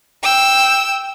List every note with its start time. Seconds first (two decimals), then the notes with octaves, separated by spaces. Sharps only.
0.23 G5 E6